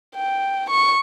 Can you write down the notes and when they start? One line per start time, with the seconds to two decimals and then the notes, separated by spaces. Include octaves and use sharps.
0.16 G5
0.70 C#6